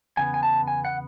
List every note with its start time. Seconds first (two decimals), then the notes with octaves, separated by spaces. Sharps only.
0.17 E2 C#3 B3 G#5
0.34 G#5
0.43 A5
0.67 G#5
0.85 F#5